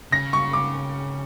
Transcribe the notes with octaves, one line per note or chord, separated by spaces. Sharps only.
C#3 A#6
C#6
D6